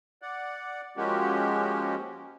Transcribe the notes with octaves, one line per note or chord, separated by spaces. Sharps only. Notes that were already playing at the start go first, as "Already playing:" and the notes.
D5 F#5
F3 G#3 A#3 C#4 F#4 G4